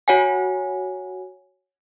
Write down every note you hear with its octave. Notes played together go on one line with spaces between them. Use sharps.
F#4 C#5 F#5 G#5